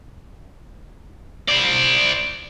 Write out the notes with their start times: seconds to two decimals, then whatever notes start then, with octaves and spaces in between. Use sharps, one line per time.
1.48 C5 D5